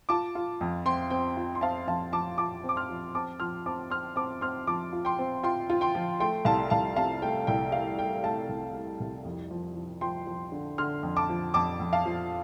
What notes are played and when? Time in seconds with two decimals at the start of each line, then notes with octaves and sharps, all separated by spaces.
0.09 F4 A5 D6
0.35 F4
0.61 F2
0.86 C4 G5 C6
1.10 C4 G5
1.37 F4
1.55 C6
1.61 C4 F5 A5
1.87 F2 F5 A5
2.13 F3 A5 D6
2.38 F4 A5 D6
2.64 C4
2.69 D6
2.76 C6 F6
2.90 F3
3.15 C4 A5 D6
3.40 F3 C6 F6
3.66 C4 A5 D6
3.90 C4 C6 F6
4.16 C4 A5 D6
4.41 C4 C6 F6
4.67 F3 A5 D6
4.93 F4
5.05 G5 C6
5.19 C4
5.43 F4 G5 C6
5.70 F4
5.81 G5 C6
5.95 F3
6.20 A3 G5 C6
6.45 C2 F5 A5
6.70 C2 F5 A5
6.96 C3 F5 A5
7.22 A3 G5
7.47 C2 G5
7.72 A3 F5
7.98 A3 G5
8.24 A3 F5 A5
8.49 C2
8.74 A3
9.00 C2
9.25 F2
9.51 F3
9.75 F3
10.01 F3 G5 C6
10.27 F3
10.52 D3
10.78 D3 C6 F6
11.03 F2
11.17 A5 D6
11.29 F3
11.54 F2 A5 D6
11.80 F2
11.93 F5 A5
12.06 F3